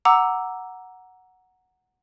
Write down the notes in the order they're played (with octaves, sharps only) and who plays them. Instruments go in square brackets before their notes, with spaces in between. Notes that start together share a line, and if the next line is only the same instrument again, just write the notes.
[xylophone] F#5 A#5 D6 E6